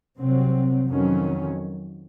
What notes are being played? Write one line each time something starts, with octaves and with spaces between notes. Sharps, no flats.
C2 C3 F#3 C4
F2 D#3 F#3 C#4